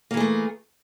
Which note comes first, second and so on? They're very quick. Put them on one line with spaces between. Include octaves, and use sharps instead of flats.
A#3 E3 G#4 A3